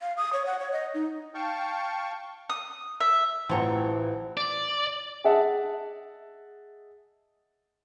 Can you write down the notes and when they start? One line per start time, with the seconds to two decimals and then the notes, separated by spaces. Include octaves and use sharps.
0.01 F5
0.17 D#6
0.33 C#5
0.46 F#5
0.59 C#5
0.72 D#5
0.94 D#4
1.35 F5 G5 A5 C#6
2.50 D#6
3.01 E5
3.49 A1 E3 C4 F4 C#5 F#5 A5 A#5
4.37 D5
5.24 G#4 D#5 E5 F#5 A5